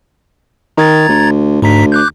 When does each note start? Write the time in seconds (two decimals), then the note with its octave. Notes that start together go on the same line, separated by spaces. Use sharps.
0.78 D#3 A#5 G#6 A6
1.09 D2
1.62 D2 G#2 A#5 B6
1.92 D6 F#6 G6